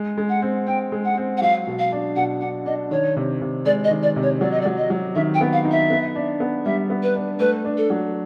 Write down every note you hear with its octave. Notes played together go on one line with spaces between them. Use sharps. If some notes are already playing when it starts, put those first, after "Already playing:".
Already playing: G#3
G#3
F#5
C4
C4 G5
G#3
F#5
C4
F#5
F#3 F5
B2
F5
D4
B2 F#5
D4 F#5
D4 D#5
D#3 C#5
C3
C3
G#3 D5
D#5
D#3
D5
C3
C#5
F#3 D5
D#5
D5
F#3
D#5
F#3
D#3 E5
G5
B3
F5
D#4
E5
B3
D4
B3
G3 E5
B3
B4
D4
A3 B4
D4
A4
F#3